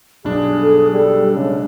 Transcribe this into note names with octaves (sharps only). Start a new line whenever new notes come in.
B1 G2 D4 G#4
A4
G3 A4
C#3 G#3